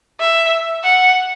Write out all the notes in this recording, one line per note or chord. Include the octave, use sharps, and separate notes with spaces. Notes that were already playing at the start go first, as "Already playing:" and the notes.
E5
F#5